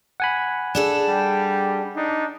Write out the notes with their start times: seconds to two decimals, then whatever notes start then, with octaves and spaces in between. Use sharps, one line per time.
0.20 F#5 G#5 B5
0.75 D4 G#4 A4
1.09 G3 G4
1.96 D4 D#4